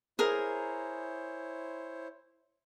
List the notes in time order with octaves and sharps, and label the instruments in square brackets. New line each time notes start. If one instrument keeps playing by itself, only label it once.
[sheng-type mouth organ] E4 C5 C#5 [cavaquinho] G#4 A#4